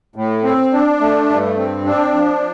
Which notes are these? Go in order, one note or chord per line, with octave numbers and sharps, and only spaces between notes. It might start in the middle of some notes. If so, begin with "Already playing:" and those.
A2
C4
D4
A3
G2
C4
D4
F3